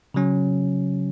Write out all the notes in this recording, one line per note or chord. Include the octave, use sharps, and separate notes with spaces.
C#3 F#3 C#4